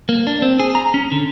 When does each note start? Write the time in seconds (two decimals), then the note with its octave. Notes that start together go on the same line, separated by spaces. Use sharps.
0.09 A#3
0.27 D4
0.42 C4
0.60 G#4
0.75 A#5
0.94 C#4
1.12 D3